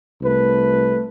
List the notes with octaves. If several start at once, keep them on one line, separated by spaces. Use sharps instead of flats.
C2 A3 B4